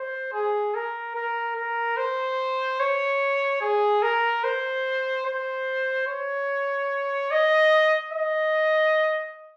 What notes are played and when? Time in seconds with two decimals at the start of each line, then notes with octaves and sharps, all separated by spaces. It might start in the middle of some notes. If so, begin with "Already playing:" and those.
Already playing: C5
0.33 G#4
0.75 A#4
1.15 A#4
1.56 A#4
1.97 C5
2.80 C#5
3.61 G#4
4.02 A#4
4.44 C5
5.26 C5
6.07 C#5
7.31 D#5
8.13 D#5